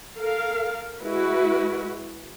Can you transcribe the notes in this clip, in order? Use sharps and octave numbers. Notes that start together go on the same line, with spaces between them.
A4 A#4 F5
G#3 E4 F#4 B4